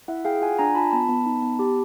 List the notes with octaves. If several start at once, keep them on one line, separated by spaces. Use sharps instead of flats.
E4 E5 F#5
G#4 F5 G5
F4 F#5 G#5
D4 G#5 A#5
F4 A5 B5
B3 A5 B5
B3
D#4
B3
G4